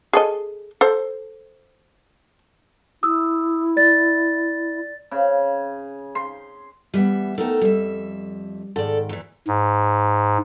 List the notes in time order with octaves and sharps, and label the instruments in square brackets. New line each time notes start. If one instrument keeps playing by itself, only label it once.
[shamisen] G#4 A4 D#5
A4 C5
[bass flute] E4 [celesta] D#6 E6
[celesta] D5 A6
[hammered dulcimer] C#3
C6
[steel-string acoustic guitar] E3 E5 [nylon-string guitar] G3 B3
[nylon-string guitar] A3 B3 D#4 [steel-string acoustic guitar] A4 A#4 G5
[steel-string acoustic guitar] F2 E5 [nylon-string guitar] G3
[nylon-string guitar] G#2 D#3 [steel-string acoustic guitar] A4 D5
[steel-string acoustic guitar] E2 E3
[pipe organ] G#2